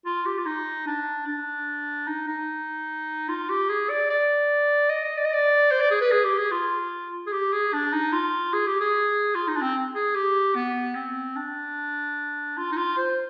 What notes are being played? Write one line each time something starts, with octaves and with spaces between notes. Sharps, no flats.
F4
G4
F4
D#4
D4
D4
D#4
D#4
F4
G4
G#4
D5
D5
D#5
D#5
D5
D#5
D5
C5
D5
G#4
B4
G#4
G4
G#4
F4
G#4
G4
G#4
D4
D#4
F4
G#4
G4
G#4
F4
D#4
D4
C4
G#4
G4
B3
C4
D4
F4
D#4
F4
C5